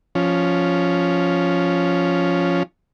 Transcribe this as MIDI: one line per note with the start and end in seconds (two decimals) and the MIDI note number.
0.15 2.63 53
0.15 2.63 61